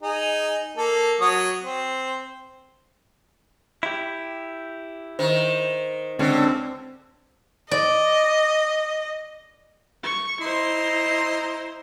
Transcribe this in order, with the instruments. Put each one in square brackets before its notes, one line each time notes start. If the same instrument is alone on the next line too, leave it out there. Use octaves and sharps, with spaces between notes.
[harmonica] D#4 G#4
A#3 A4
F#3 C#5 D#6
C4
[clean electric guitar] E4 G4
[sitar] D#3 [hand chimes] C5
[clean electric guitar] C#2 C#4 [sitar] D3 [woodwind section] C4
[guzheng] D5 [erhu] D#5
[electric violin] C#6
[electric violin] E4 C5 [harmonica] D#5 A#5 C6